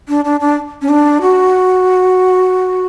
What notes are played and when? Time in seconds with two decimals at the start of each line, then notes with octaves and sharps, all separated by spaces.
0.08 D4
0.25 D4
0.40 D4
0.82 C#4
0.89 D4
1.22 F#4